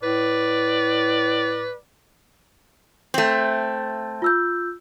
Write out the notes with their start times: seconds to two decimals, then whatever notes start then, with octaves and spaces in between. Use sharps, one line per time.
0.03 A2 B4 D5
3.14 A3 C4
4.22 F4 E6 G6